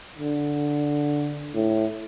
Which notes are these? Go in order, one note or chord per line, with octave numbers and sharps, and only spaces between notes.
D3
A2